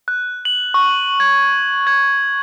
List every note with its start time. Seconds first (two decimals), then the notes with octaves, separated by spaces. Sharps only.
0.08 F#6
0.45 F#7
0.74 C#6
1.20 G#6
1.87 G#6